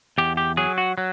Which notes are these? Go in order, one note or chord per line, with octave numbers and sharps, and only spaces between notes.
E2 G4
G4
F#3 G#4
F#4
F#3